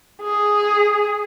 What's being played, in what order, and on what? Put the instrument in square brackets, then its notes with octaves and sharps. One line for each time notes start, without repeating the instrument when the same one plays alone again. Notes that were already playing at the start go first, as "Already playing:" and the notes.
[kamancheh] G#4